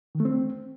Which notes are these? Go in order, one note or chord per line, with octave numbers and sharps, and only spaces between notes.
D#3
A3
C4